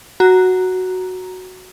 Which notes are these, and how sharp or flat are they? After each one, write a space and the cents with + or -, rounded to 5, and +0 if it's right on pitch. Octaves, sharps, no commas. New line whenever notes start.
F#4 +0 A#5 +0